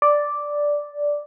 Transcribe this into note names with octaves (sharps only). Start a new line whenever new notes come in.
D5